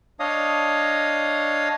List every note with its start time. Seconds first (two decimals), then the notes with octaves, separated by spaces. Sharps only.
0.20 D4 C#5 D#5 F5 D#6